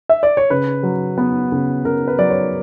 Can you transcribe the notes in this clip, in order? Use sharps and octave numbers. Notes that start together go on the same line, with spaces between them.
E5
D5
C#5
C#3 B4
F#3
B3
C#3
C#3 A#4
B4
F#3 D5
C#5